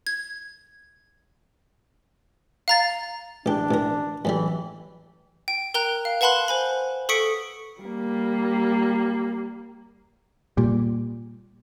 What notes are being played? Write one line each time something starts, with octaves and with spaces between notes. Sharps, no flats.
G#6
F5 A#5 A6
A1 D4 G4
A1 A#4
F#2 A2 E3 G3
G5
A#4 G5 A#5 F#6
F5
B4 F#5 A5 B5 C6 F#6
C5 G#5 B5
A4 C#6 D#6 B6 C#7 D7
G3 A#3
A#2 G3